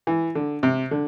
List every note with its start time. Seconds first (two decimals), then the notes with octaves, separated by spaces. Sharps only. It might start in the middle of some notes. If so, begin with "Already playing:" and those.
0.07 E3
0.35 D3
0.63 C3
0.91 D3